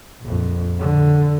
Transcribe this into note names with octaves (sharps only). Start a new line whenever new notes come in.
A#1 F2
D3